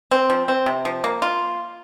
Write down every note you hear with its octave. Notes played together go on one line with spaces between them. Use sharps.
C4
F3
C4
C3
F3
A#3
F4